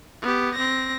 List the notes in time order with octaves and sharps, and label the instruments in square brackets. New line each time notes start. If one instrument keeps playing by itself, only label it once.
[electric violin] B3 G4
C4 A#6